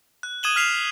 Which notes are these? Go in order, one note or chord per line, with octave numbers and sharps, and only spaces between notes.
F#6
D#6 G#6 D#7 E7 F#7 G7
F6 B6 C7 F7